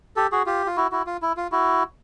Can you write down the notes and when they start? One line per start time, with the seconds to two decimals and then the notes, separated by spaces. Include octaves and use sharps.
0.16 G4 A4
0.32 F#4 G#4
0.46 F4 G4
0.66 F4
0.77 E4 F#4
0.91 E4 F#4
1.07 F4
1.22 E4
1.37 F4
1.52 E4 F#4